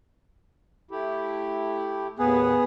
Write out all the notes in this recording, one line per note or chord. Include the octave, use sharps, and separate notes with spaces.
A3 E4 G4
D#2 A2 B3 G#4 B4